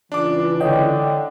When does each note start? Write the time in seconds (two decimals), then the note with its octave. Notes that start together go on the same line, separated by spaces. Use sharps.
0.12 C#2 E3 D4 D6
0.61 D3 C#5 D#5 G5